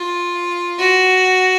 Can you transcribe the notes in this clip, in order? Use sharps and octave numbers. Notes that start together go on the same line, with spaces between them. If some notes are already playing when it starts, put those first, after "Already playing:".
Already playing: F4
F#4